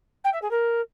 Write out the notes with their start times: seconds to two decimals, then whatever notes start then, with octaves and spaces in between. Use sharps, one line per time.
0.24 G5
0.33 E5
0.41 G#4
0.50 A#4